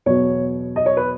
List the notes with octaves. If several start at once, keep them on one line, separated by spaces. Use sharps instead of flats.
E2 B2 F#3 B3 C#5
D#5
C#5
B4